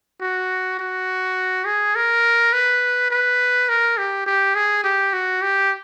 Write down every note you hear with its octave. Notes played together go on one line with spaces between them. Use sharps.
F#4
F#4
G#4
A#4
B4
B4
A#4
G4
G4
G#4
G4
F#4
G4